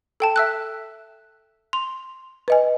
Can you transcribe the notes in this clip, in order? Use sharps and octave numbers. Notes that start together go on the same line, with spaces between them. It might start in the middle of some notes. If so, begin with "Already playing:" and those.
A4 G5 A5
E5 E6 F#6
C6 F7
B4 D#5 G#5